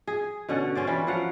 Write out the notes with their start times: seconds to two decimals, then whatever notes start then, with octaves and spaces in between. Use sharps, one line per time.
0.07 G#4
0.49 B2 D3 C#4 F#5
0.75 C#4 C5 D5
0.87 E3 G3 C#4
1.07 F3 F#3 F5 F#5